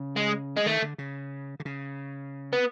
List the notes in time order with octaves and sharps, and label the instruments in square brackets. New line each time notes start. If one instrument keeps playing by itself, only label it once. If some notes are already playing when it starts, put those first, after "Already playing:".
Already playing: [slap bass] C#3
[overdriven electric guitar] G#3
G#3
[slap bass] D#3 [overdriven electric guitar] A3
[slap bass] D3
C#3
D3
C#3
[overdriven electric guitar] B3